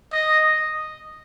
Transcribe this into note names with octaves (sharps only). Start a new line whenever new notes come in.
D#5